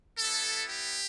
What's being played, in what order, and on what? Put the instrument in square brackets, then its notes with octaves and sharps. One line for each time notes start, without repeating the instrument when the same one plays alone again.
[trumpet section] G3 B3 E4 A4
G4